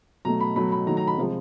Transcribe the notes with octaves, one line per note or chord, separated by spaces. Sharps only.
B2 F#3 A3 A#5
B5
B2 F#3 A3 B5
B5
D#3 F#3 A3 A#5
A#5
B5
C3 F3 G#3